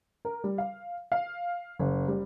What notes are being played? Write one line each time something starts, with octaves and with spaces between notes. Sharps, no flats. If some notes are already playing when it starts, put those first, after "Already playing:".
A#4
G3
F5
F5
F#1
G3